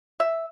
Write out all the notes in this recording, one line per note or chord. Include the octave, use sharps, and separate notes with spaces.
E5